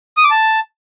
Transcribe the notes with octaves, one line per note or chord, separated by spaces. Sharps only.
D#6
D6
A5